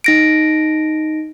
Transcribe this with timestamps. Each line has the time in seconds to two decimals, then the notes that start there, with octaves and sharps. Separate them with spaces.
0.04 D#4 A#6 D7